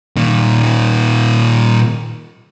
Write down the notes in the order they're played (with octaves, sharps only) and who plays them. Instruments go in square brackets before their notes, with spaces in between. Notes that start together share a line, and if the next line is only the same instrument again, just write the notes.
[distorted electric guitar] A#2 D#3